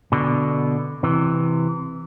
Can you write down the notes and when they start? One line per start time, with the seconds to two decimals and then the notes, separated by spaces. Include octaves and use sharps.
0.12 B2 D3
1.03 C3 E3